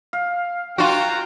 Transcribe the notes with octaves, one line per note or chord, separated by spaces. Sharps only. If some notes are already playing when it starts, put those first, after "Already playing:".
F5
F4 F#4 G5 A#5